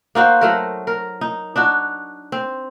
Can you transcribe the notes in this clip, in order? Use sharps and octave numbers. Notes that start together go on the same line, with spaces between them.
A#3 D#4 F#4 C5
F#3 A3 A#4
A#4
D#4
D4 D#4 F#4
C4